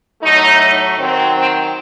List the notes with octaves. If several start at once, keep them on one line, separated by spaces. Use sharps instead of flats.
A2 F#3 A3 D#4
D#3 F#3 C4
C4